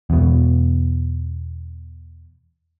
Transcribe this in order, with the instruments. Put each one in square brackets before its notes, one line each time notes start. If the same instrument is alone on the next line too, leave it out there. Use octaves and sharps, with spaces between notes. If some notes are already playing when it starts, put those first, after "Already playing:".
[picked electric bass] E2 B2